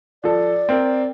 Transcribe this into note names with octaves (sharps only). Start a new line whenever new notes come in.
F3 A4 D5
C4 A#4